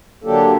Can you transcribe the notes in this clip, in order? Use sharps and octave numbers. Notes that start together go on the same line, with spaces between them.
D3 F#3 A#3 D4 G4 A4